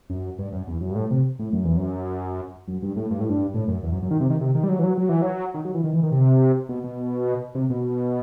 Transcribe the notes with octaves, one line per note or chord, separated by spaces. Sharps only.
F#2
G2
F#2
E2
F#2
G2
A2
C3
A2
F#2
E2
F#2
F#2
G2
A2
G2
A2
G2
A2
F#2
E2
F#2
F#2
D#3
C3
D#3
C3
D#3
G3
F#3
E3
F#3
F#3
E3
F#3
D#3
F#3
E3
D#3
E3
D#3
C3
B2
B2
C3
B2